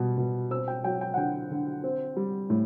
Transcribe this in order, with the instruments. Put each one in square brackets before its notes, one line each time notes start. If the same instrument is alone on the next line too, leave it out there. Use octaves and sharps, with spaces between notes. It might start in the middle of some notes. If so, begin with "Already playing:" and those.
Already playing: [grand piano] B2 G3
B2
C4 E6
G5
F#3 G5
G5
F#5
D3 G5
D3
C4
G3
A2